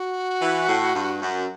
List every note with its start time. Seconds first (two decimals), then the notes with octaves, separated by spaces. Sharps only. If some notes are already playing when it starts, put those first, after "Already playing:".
Already playing: F#4
0.42 E3
0.69 A2
0.95 G2
1.22 F#2